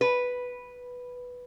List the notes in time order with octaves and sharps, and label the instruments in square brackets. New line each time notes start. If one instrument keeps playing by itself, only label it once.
[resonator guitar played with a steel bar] B4